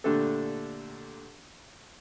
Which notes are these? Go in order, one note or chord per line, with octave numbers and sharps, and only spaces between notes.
A#2 D3 A3 D4 G4 A4